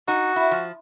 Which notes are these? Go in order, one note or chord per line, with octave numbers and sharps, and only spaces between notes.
D#4 F#4
E4
F3